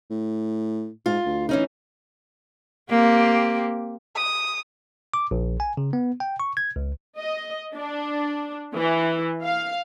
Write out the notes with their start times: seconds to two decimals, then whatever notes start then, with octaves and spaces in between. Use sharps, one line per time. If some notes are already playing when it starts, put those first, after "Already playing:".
0.10 A2
1.06 G#2 F4
1.25 D2
1.49 E3 C#4 D#4
2.90 A#3 C4 G4
4.16 D#6
5.14 D6
5.31 A#1
5.60 G#5
5.77 C#3
5.93 B3
6.20 G5
6.40 C#6
6.57 G#6
6.76 C#2
7.19 D#5
7.75 D4
8.74 E3
9.43 F5